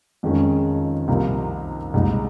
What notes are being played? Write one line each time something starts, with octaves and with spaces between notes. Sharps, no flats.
F2 D#3 G#3 C#4
C2 C3 F3 A#3 D#4
C2 A#2 G#3 D#4